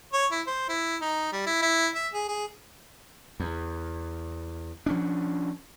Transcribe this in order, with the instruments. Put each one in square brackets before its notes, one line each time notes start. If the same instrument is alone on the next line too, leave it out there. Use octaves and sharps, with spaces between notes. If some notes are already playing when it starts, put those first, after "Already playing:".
[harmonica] C#5
E4
C5
E4
D#4
G3
E4
E4
E5
G#4
G#4
[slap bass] E2
F3 C#4 D4